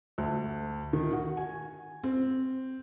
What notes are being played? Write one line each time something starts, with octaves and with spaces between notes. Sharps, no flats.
D2
D#3
F#4
G#5
C4